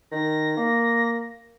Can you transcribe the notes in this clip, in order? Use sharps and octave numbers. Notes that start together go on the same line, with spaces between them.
D#3 A#6
A#3